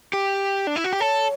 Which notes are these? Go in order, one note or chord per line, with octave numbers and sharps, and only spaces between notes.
G4
D4
E4
F#4
G4
A4 C#5